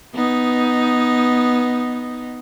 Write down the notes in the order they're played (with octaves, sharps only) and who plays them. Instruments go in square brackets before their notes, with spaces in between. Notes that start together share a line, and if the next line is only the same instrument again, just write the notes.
[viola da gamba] B3 D#4